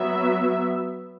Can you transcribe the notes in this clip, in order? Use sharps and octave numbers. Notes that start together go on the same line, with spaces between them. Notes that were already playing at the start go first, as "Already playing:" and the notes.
Already playing: F#3 B3 E5